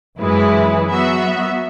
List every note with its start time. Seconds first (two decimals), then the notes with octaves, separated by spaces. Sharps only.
0.18 F#2 E3 G#3 E4 B4
0.89 F#3 B3 F#4 E5